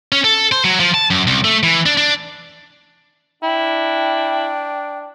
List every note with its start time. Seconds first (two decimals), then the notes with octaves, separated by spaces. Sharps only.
0.12 C#4
0.24 A4
0.52 C5
0.64 F#3
0.80 F3
0.94 A5
1.11 F#2
1.27 C2
1.45 A3
1.63 E3
1.86 D4
1.97 D4
3.43 D4 E4 G5